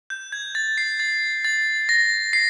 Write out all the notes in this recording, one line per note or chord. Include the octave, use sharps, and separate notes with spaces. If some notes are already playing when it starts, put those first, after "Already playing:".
G6
G#6
A6
C7
A6
A6
A#6
C7